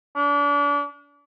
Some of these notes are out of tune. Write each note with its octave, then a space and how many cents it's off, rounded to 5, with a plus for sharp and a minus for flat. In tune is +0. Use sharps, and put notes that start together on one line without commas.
D4 -35